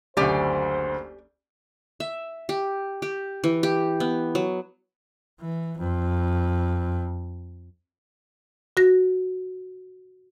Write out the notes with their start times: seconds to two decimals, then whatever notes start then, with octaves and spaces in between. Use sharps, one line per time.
0.17 F#1 D2 G4 C5 D5 G#5
2.00 E5
2.49 G4
3.02 G4
3.44 E3
3.63 G4
4.00 B3
4.35 F#3
5.41 E3
5.79 F2
8.77 F#4 A#6